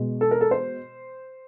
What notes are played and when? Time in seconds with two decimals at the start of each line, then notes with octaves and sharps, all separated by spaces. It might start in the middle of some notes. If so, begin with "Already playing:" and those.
Already playing: B2 G#3
0.21 A4
0.31 A#4
0.41 A4
0.51 C5